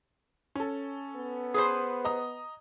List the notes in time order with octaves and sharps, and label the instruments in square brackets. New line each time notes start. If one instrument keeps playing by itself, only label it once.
[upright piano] C#4 A4
[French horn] B3
[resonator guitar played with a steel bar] G#4 B4 C5
[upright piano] D#5 A#5 D#6